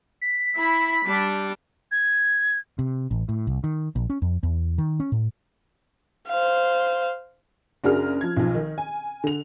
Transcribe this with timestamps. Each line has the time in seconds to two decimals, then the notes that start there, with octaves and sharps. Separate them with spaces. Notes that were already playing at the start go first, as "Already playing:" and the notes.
0.21 B6
0.57 E4 B5
1.06 G3 D4
1.91 G#6
2.79 C3
3.11 A1
3.29 A2
3.47 C2
3.64 D#3
3.95 A#1
4.10 C#4
4.22 F2
4.43 E2
4.78 D#3
5.00 C#4
5.12 A2
6.28 C5 F5
7.84 F#1 D4 F#4 G#4 A#4 F6
8.21 F3 G#6
8.36 B1 F3
8.54 D#3
8.78 G#5
9.24 D3 F7